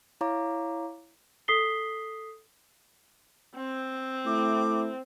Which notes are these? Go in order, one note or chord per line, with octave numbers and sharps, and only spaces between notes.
E4 C#5 F5 A#5 D6
A4 D#6 B6 C7 G7
C4
A3 E4 D6